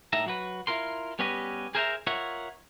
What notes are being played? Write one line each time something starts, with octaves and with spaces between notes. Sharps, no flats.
A2 D#4 E5 A#5
F#3 F#4 B4
E4 F4 A#4 C6
G3 B3 C#4 G4 B4 D#5
G#4 A#4 C5 D#5 E5 A#5
F4 A#4 C#5 E5 F#5